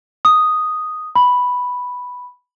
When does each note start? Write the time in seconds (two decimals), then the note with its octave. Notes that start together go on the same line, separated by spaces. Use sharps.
0.25 D#6
1.15 B5